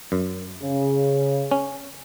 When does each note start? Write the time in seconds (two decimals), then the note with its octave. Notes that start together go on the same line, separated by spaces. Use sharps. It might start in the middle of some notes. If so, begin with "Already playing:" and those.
0.12 F#2
0.63 C#3
1.51 C#4